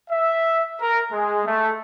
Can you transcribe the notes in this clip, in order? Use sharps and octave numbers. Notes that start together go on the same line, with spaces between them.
E5
A#4
G#3
A3